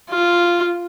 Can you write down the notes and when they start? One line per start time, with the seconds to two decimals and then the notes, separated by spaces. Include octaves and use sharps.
0.10 F4